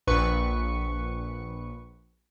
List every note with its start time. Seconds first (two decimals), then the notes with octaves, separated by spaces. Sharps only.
0.07 A#1 B4 C#6 C#7